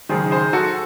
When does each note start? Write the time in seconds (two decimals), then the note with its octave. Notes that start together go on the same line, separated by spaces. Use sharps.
0.09 F#1 F#2 D#3 G#4 C5
0.31 G#4 C5
0.53 F#4 A4